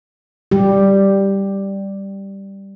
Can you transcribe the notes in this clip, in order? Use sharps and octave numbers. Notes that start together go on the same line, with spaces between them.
G3 G4